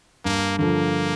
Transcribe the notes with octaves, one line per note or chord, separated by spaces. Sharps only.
G2 A#3
D3 F3 A#3